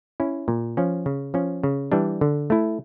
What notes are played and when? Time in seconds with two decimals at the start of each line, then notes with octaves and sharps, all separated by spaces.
0.20 C#4 E4
0.48 A#2
0.77 F3 C#4
1.06 C#3
1.34 F3 C#4
1.64 C#3
1.92 E3 G3 D4
2.21 D3
2.50 A3 E4